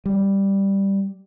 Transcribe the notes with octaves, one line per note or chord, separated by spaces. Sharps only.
G3